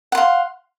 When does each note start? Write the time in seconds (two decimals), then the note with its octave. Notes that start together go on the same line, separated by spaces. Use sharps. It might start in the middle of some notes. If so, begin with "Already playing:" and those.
0.12 F#5
0.15 C6
0.17 F5